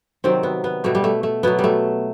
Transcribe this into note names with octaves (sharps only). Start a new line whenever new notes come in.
C3 D#3 F#3 C4
B3
B3
B2 G3 A3
G3
A3
A3
B2 F#3 B3
G3
A3